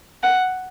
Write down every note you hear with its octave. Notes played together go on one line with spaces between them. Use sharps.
F#5